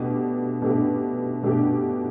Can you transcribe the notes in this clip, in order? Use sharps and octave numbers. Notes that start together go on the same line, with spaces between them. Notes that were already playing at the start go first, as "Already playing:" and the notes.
Already playing: B2 A3 D4 G4
B2 A3 D4 G4
B2 A3 D4 G4